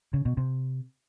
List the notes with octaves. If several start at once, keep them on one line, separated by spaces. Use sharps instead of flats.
C#3
B2
C3